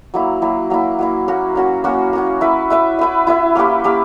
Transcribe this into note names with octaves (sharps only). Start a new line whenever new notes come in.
F#3 A#3 E4
F#3 A#3 E4
F#3 A#3 E4
F#3 A#3 E4
A#3 C#4 F#4
A#3 C#4 F#4
A#3 C#4 F#4
A#3 C#4 F#4
E4 B4 E5
E4 B4 E5
E4 B4 E5
E4 B4 E5
A#3 C#4 G4 B4
A#3 C#4 G4 B4